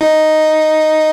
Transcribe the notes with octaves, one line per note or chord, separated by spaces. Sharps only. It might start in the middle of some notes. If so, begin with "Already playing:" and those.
D#4